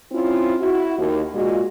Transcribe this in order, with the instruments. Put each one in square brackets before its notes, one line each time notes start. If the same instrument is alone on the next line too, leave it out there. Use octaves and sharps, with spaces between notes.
[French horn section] C4 C#4 E4 F4
E4 F#4
D#2
A#2 G#3 F4 F#4